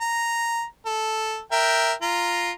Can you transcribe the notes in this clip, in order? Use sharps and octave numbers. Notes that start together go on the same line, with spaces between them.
A#5
A4
A#4 E5 G5
F4 A#5